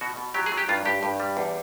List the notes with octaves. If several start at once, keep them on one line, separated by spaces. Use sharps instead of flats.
B2 F#4
B2
F#3 G4
G#4
F#3
G4
G2 F4
G2 G4
G2
G3
E2